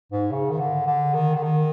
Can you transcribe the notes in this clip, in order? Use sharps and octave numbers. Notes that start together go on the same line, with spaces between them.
G#2
C#3
D#3
D3
D3
D#3
D3
D#3